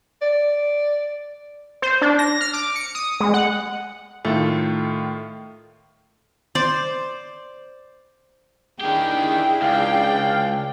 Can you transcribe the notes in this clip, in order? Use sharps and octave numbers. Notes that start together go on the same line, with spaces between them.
D5
C5
D4
A#6
F6
D6
C#7
D#6
G#3
F#5
A2 D#3 A3 F4
C5 D5
D#3 D4 E4 G4 G#4 G5
C#2 D5 F5 G5